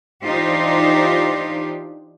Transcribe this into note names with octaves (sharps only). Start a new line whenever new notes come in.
E3 D4 D#4 F4 G4 C5